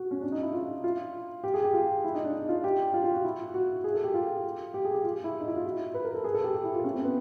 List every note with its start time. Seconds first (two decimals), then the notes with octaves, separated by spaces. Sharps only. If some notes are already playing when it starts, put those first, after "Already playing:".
Already playing: F#4
0.11 C#4
0.21 D4
0.32 D#4
0.42 E4
0.53 F4
0.84 F4
1.44 G4
1.54 G#4
1.64 G4
1.73 F4
2.04 E4
2.14 D#4
2.24 D4
2.34 D#4
2.49 F4
2.64 G4
2.94 F4
3.04 F4
3.14 F#4
3.24 E4
3.54 F#4
3.84 G#4
3.94 A4
4.04 G4
4.14 F4
4.74 G4
4.85 G#4
4.94 G4
5.04 F4
5.24 E4
5.40 D#4
5.48 E4
5.56 F4
5.65 F#4
5.94 B4
6.05 A#4
6.14 A4
6.24 G#4
6.34 A4
6.44 G4
6.55 G4
6.64 E4
6.74 F4
6.84 C#4
6.95 C4
7.04 B3